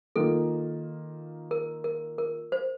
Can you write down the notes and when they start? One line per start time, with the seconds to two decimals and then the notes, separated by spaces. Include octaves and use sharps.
0.16 D#3 A#3 F4 A4
1.51 A#4
1.84 A#4
2.18 A#4
2.52 C5